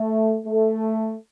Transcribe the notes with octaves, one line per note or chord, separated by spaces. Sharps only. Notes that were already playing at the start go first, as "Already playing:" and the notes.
Already playing: A3
A3